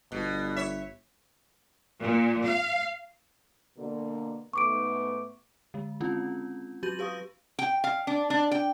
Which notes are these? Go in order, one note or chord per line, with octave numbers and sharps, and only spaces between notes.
G1 B2
C#5 E5
A#2
F5
B2 D3 A#3
G#2 A3 B3 C#6 D6 D7
D3 G#3
D#3 G#3 C4 C#4 E4 F4
F#3 F#4 G4 G6 D#7 F#7
G4 B4 F5 C#6 D#6
G5
F5
D4
D4
G5